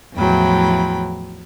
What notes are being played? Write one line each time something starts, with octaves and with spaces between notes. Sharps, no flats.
E2 A2 F3 F#3 G5 B5